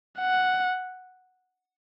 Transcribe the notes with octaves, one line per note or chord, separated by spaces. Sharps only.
F#5